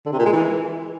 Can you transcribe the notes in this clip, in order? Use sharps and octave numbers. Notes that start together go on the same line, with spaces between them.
D3
C3
A#2
G#3
E3